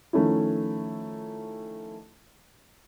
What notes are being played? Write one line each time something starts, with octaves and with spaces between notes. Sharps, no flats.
D#3 F3 A3 C#4 E4